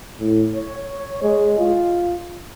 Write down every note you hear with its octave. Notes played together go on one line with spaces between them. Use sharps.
A2
C#5
G#3
F4